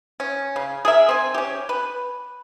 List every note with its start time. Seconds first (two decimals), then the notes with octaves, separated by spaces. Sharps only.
0.20 C#4
0.56 C#3
0.85 G#4 A#4 E5
1.09 C4 G#5
1.34 C#4 G4
1.69 B4